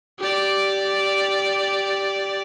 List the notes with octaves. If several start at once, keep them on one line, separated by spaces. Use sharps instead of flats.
G4 D5